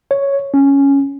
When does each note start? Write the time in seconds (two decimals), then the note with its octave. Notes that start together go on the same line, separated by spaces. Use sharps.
0.11 C#5
0.54 C#4